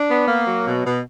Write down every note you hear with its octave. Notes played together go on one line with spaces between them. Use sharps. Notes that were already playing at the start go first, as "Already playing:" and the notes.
Already playing: D4
B3
A#3
F#3
B2
B2